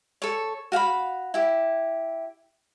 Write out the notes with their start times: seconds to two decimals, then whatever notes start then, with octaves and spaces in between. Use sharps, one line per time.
0.22 A4 C#5
0.72 F#4 F5 G5 B5
1.34 E4 G4